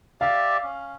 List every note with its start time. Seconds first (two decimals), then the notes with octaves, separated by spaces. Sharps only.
0.21 G4 D5 E5 F5
0.64 C#4